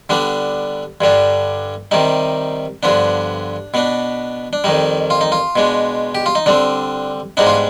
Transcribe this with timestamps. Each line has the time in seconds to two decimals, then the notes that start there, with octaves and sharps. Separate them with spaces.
0.09 D3 G3 B3 D4
1.01 G2 D3 G3 D4
1.91 C3 D#3 G3 D#4
2.83 G2 D3 F3 B3 D4
3.74 B2 B3 D4
4.53 D4
4.64 F2 D#3 G3 D#4
5.10 F4
5.21 D#4
5.32 F4
5.56 B2 G#3 D4
6.15 G4
6.26 F4
6.35 D#4
6.46 D3 G3 C4 D4
7.37 G#2 G3 B3 D4 D#4
7.46 F4